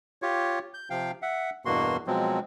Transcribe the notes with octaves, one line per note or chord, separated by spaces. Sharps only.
F4 G4 C#5
G6
C3 F3 F5 G5
E5 F#5
E2 G2 B2 A#3 F#4 C6
B2 F3 F#3 G#3 C4